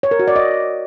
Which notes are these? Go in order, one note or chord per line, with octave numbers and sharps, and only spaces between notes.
C#5
A#4
F#4
D5
D#5